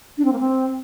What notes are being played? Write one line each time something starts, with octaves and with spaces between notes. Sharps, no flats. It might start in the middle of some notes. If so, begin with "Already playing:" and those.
D4
C4
A#3
C4